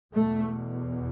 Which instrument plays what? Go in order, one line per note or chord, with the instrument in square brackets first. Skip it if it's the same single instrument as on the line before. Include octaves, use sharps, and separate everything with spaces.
[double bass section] E2 B2 A3